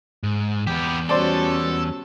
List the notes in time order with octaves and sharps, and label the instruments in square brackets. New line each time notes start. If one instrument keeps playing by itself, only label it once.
[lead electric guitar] G#2
[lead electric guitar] E2 [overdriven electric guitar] B3 G4
[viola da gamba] G3 C#4 F#4 [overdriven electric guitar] A4 [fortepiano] C5 D5